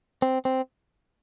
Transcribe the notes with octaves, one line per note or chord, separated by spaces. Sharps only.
C4
C4